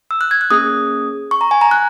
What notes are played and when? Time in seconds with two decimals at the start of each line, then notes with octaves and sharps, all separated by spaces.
0.11 E6
0.21 F#6
0.31 G#6
0.41 F#6
0.50 A#3 C#4 G#4 D#6
1.31 C#6
1.41 A#5
1.51 G#5
1.61 A#5
1.71 F#6